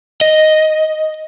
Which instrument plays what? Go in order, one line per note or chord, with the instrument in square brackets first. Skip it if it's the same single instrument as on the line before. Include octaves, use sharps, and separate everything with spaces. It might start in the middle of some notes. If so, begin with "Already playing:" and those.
[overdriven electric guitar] D#5